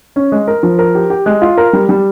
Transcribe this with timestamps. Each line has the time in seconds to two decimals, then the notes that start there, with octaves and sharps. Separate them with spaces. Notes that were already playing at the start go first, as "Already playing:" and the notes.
0.16 C#4
0.32 G#3
0.48 A#4
0.63 F3
0.79 A#4
0.95 G4
1.10 G4
1.26 G#3
1.42 F4
1.58 A#4
1.73 G3
1.89 G3